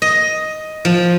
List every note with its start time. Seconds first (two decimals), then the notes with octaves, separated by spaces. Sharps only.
0.02 D#5
0.85 F3